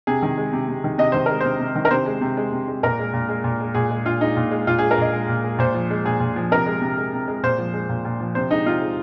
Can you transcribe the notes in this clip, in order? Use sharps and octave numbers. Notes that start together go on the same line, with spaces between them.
C3 G#4
D#3
G#3
C3
C3
D#3
C3 D#5
D#3 C5
G#3 A#4
C3 C5
C3
D#3
A#4
C3 C5
G#3
C3
G#3
C3
G#3
A#2 A#4
G#3
A#2
G#3
A#2
G#3
A#2 G#4
G#3
A#2 F4
G#3 D#4
A#2
G#3
A#2 F4
G#3 G#4
A#4
A#2 D#5
G#3
A#2
G#3
A#2 C5
F3
G#3
A#2 G#4
A#2
F3
C3 A#4
G#3
C3
G#3
C3
G#3
A#2 C5
F3
G#3
A#2
A#2
F3
C3 C5
G#3 D#4
C3 F4
G#3